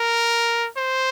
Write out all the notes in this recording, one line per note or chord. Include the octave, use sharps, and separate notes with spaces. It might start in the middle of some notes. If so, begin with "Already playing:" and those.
Already playing: A#4
C5